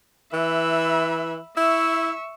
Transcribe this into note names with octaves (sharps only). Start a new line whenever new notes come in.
E3 E5 B5
E4 E5 C#6